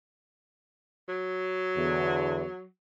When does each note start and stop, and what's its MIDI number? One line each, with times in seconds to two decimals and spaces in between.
1.08 2.65 54
1.76 2.44 40
1.76 2.44 50